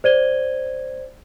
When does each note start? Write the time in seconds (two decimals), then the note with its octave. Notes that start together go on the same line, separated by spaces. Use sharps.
0.04 C5 D5 G#6 D#7 G7